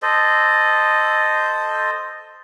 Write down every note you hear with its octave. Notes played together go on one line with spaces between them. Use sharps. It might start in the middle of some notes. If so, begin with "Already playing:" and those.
A4 C5 D#5